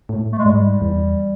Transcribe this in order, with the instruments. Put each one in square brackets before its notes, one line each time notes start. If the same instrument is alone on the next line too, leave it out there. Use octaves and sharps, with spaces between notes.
[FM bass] A2
[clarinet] A3
G#3
[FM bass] G#2 [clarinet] G3
[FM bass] E2